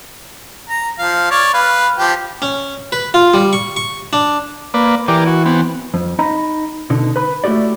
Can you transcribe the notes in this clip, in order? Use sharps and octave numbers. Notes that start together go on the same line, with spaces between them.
A#5
F3 F5
C#5 D5
B4 F5
F3 G4
C#4
B4
F4
G3
C#6
C#6
D4
A#3 B4 D5
E3 G4 A#4 D5
F#4
B3 C4
F2
D#4 D#5 A#5 B5
B2 D3 D#4
B4 B5
A3 E4 F#4 G4 D5